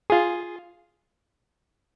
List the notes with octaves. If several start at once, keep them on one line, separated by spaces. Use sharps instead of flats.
F4 G#4